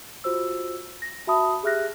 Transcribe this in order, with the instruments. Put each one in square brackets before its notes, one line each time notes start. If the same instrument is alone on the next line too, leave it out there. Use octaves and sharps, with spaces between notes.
[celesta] F4 F#4 C5 E6
A#6
F#4 E5 A5 B5 D#6
G4 G#4 E5 F6 F#6 A#6